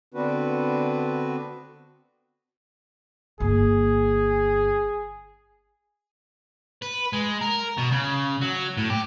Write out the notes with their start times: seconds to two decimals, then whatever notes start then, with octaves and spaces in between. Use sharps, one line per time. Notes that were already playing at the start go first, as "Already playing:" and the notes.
0.14 D3 B3 C4 D4 F#4 B4
3.40 G1 A#3 G#4
6.82 B4
7.13 G#3
7.41 A#4
7.78 B2
7.92 C#3
8.41 F#3
8.77 A2
8.90 G4